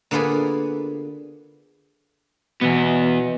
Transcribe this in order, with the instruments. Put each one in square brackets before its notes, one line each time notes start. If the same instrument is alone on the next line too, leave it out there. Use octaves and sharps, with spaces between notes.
[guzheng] D3 A#3 B3 F4 G#4 B4
[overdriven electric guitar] E2 B3 [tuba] B2